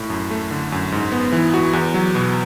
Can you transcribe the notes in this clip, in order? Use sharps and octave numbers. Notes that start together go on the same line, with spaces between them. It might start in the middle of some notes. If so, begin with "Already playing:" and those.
Already playing: A2
F#2
A3
D3
F#2
G#2
B3
E3
F#4
E2
F#3
B2